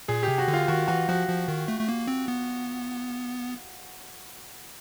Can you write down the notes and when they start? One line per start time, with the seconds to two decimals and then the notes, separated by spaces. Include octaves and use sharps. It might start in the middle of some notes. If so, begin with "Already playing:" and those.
0.08 A#2 G#4
0.23 G4
0.28 C3
0.38 F#4
0.48 D3
0.53 F4
0.68 D#3 F#4
0.88 E3 F#4
1.09 F3 F#4
1.28 F3
1.48 D#3
1.68 A3
1.81 A3
1.89 A#3
2.08 C4
2.28 B3